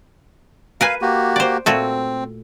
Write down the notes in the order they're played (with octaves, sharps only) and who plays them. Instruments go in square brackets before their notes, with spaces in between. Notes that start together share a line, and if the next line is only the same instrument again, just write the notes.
[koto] A#4 B4 G#5 [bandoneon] F5
[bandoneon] A#3 F#4 G4
[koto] C5 D5
[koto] A#2 A3 F#4 [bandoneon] C4